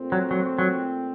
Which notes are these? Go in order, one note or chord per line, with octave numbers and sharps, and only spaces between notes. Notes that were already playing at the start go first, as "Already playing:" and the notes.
Already playing: A#2 A3 C4 F4
F#3
F#3
F#3